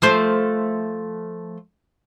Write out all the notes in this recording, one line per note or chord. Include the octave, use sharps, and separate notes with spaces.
F3 A3 C5